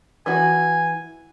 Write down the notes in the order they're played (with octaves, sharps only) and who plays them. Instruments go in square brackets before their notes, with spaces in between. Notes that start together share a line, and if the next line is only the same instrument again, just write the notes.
[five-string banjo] E3 F#4 [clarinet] G#5